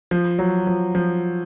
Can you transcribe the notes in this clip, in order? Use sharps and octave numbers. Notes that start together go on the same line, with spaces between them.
F3
F#3
F3
F3